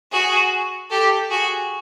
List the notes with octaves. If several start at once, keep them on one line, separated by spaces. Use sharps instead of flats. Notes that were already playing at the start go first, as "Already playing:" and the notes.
F#4 G#4
G4 A4
F#4 G#4